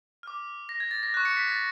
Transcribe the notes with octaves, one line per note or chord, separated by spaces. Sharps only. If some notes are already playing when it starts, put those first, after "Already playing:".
D6 F6
A#6
G#6
A6
A#6
C#6 F#6
C#7
B6
A6